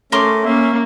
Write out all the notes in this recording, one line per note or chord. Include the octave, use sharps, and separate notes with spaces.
A3 C#4 A#4 C6 D6
A#3 C#4 E5